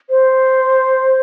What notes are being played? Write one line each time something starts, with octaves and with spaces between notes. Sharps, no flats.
C5